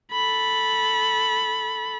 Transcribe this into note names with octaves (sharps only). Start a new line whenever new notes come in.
A4 B5